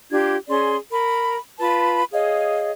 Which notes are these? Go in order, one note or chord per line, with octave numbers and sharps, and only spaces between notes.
D4 F4 G4 G#6
C#4 G#4 D5 C6
A#4 B5
F4 B4 A5 B5
G#4 C#5 D#5 F5